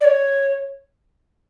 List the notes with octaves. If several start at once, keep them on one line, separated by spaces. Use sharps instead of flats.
D5
C#5